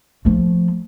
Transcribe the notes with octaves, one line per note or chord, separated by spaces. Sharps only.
F3 A3